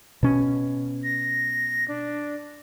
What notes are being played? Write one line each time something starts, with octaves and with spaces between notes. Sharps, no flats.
B2 C#4
A#6
D4